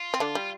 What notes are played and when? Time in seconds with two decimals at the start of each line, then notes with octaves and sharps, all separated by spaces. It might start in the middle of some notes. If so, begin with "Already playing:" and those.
Already playing: F4
0.14 C4
0.20 D3 D4
0.35 G3